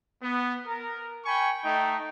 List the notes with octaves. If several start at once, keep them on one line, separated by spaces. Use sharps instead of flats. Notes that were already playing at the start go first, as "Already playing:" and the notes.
B3
A#4
G5 G#5 B5 C#6
A3 D#4 G5